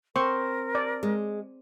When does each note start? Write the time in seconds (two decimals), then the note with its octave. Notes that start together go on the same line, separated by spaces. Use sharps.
0.16 C4 A#4 C#6
0.75 D5
1.03 G#3